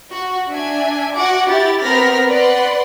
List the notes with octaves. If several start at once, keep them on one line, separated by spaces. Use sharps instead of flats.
F#4
D4 E5 G#5
F#4 F#5 D6
E4 G4 A6
B3 C4 A#4 F6 A#6 B6
B4 D5 F#5 C6